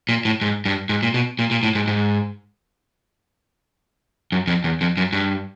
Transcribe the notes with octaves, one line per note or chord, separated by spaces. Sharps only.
A#2
A2
G#2
G2
G#2
A#2
B2
A#2
A#2
A2
G#2
G#2
F#2
F2
E2
F2
F#2
G2